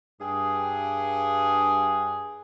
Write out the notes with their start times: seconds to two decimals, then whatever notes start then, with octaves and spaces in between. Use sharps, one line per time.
0.21 G2 G#4